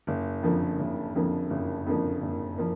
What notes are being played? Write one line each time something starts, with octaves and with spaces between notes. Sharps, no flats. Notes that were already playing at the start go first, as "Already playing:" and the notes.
F#1
F2 D3 F3 A#3
F#1
F2 D3 F3 A#3
F#1
F2 D3 F3 A#3
F#1
F3 A#3